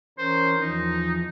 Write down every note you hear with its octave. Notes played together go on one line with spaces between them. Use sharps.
E3 C#4 A#4 C5
E2 E3 F3 D#4